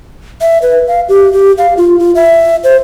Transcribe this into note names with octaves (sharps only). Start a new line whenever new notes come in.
E5
B4
F5
G4
G4
F5
F4
F4
E5
C5